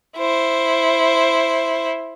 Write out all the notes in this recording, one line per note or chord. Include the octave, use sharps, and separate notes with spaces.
E4 C5